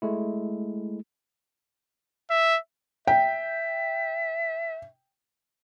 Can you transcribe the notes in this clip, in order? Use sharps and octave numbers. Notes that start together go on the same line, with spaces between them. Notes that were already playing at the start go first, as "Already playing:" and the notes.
G#3 A3 E4
E5
E5 G5